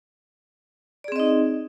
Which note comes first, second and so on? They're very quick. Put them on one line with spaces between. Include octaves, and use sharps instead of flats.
D5 G#4 C4 D#5 D#4